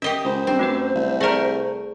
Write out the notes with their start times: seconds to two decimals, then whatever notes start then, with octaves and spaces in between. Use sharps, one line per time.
0.02 C#4 G4 A#4 D#5 E5
0.25 C#2 C5
0.47 G2 C4
0.59 F#2 A3 F#4 B4
0.95 C2
1.21 A3 G#4 A#4 D5 A#5